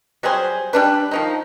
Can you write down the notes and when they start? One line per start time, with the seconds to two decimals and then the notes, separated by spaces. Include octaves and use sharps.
0.23 F#3 G3 G#4 C5
0.73 G3 D4 B4
1.11 D#3 F3 D#4